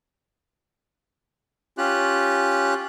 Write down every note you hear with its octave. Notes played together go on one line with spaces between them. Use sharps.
C#4 F4 G4 F#6